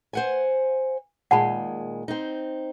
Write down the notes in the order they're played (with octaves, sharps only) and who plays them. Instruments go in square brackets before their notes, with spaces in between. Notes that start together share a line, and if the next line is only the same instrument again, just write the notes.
[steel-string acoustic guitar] C5 F#5 G#5
[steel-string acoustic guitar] A#2 D#3 G#3 [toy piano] F#5 A5 B5
[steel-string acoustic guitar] C4 D#4